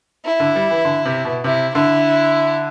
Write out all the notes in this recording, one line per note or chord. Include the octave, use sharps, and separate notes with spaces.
E4
D3
G3
E3
D3
C3
B2
C3 E4
D3 E4